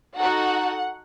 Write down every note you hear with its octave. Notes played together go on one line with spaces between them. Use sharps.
D#4 F#4 A4 F#5